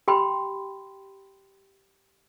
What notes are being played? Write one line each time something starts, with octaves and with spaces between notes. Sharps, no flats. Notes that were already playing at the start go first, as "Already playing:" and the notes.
G4 G5 B5 C6